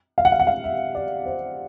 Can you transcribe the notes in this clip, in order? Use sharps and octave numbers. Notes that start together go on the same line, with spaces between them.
F5
F#5
F5
F#5
F5
E5
D5
C5